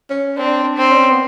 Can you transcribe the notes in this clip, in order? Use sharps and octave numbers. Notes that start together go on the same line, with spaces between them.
C#4
C4 D4
D4
C4
C#4
B3